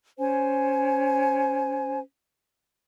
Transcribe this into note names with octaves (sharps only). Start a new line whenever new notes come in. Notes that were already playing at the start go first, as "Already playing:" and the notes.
C#4 C5 G#5